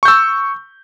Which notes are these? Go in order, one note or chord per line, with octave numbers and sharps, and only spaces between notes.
C#6 E6 G6